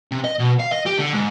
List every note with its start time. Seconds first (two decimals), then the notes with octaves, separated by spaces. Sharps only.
0.11 C3
0.24 D#5
0.39 B2
0.59 F5
0.72 D#5
0.86 G4
0.98 D3
1.13 G#2